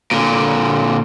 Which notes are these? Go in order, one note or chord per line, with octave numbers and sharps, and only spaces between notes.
A#2 D3